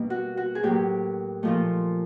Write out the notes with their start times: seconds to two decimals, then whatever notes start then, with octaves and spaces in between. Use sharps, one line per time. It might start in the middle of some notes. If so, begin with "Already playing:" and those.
Already playing: B2 G3 A#3
0.10 F#4
0.37 F#4
0.55 G#4
0.63 A2 F#3 A#3 G4
1.43 A#2 F3 A3